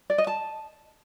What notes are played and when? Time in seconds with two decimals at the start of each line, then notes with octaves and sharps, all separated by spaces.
0.10 D5
0.18 D#5
0.27 A5